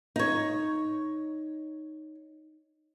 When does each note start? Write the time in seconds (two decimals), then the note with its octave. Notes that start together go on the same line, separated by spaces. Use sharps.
0.16 D#4 C#5